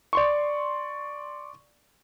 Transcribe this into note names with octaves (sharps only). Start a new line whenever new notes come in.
D5 C6 C#6